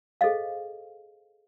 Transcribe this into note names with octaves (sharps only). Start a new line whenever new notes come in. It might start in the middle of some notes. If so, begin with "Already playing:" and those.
G#4 A4 C5 D#5 F5